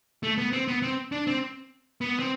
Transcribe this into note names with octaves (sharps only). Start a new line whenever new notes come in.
A3
B3
C4
B3
C4
D4
C4
B3
C4